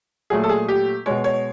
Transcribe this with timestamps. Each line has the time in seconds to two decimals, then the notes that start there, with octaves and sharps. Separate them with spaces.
0.30 A#2 F#3 A3 G#4
0.43 A4
0.49 G#4
0.68 G4
1.06 B2 G#3 C#5
1.24 C#5